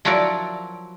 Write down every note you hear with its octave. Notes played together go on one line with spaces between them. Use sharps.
F3 F#3 E4 F#4 A#4 D5